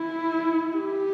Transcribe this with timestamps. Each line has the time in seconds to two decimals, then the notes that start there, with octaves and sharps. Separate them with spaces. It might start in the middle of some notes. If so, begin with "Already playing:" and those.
Already playing: E4
0.76 G4